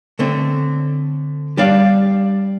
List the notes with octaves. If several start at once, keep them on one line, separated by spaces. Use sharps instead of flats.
D3 A3 C4
G3 D4 G4 D5 F5